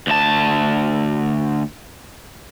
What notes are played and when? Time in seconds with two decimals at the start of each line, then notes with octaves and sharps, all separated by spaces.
0.07 D2 A5